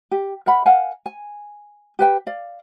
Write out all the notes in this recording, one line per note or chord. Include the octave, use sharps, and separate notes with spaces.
G4
A#4 E5 F#5 B5
A#4 F5 F#5 G#5
G#5
G4 B4 G5
D5 F5